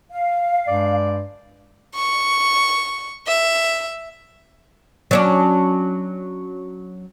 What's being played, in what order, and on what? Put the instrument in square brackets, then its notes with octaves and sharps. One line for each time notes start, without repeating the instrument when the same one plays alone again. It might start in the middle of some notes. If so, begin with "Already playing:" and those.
[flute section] F5
[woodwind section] G2 G#3 D5
[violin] C#6
E5
[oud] F#3 C#4 D4